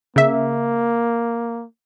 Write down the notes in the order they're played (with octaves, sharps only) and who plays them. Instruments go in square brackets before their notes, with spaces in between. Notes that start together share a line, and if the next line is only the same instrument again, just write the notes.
[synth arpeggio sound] C#3 E5 [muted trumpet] A#3